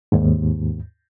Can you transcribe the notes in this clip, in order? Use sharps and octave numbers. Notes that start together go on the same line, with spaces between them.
D#2 G#2